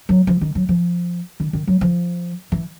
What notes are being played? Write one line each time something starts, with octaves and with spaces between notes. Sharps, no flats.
F#3
F3
D#3
F#3
F3
D#3
D#3
F#3
F3
E3